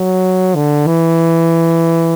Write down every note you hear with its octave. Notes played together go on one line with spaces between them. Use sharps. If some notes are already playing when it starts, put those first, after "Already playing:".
Already playing: F#3
D3
E3